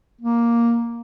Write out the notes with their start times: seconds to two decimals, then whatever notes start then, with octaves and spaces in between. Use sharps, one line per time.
0.21 A#3